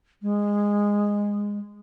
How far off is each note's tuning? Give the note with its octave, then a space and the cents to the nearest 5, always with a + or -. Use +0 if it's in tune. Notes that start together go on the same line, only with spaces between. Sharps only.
G#3 -15